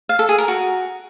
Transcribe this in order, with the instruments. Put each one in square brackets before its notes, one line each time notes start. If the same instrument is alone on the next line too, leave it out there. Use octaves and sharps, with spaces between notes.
[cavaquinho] F5
A4
G#4
A#4
F#4